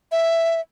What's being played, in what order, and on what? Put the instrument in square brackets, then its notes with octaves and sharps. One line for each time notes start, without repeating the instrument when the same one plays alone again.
[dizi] E5